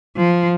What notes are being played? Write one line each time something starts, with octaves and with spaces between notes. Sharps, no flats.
F3